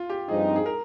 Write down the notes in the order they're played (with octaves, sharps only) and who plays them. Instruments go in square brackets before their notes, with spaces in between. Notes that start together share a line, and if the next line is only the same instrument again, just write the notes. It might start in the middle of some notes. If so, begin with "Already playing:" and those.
Already playing: [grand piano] F4
G4
[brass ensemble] G2 F3 C4 D#4 [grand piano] G#4
[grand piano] G#4
A#4